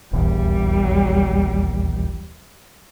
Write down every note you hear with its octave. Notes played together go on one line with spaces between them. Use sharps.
D#1 A#1 E2 G3